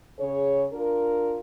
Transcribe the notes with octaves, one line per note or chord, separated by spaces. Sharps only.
C#3 G#4 C#5
D4 F4 A#4